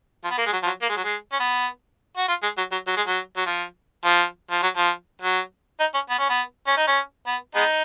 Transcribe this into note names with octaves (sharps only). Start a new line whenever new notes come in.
F3
B3
A#3
G#3
F#3
F3
F#3
A#3
G#3
F#3
G#3
C#4
B3
F#4
F4
G#3
F#3
F#3
F#3
G#3
F#3
F#3
F3
F3
F3
F#3
F3
F#3
D#4
C#4
B3
C#4
B3
C#4
D#4
C#4
B3
G#3 B3 D#4